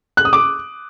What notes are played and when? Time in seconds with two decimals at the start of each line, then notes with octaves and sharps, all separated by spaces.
0.17 F#6
0.25 D#6
0.33 D6